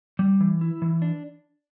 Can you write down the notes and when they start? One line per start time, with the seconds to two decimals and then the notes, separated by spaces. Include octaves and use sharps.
0.19 G3
0.41 E3
0.61 E4
0.82 E3
1.02 D4